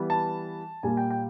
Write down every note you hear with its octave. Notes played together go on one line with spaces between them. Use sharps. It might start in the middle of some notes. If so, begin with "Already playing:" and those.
Already playing: E3 G3 B3
A5
A#2 G3 A#3 G#5
G5
G5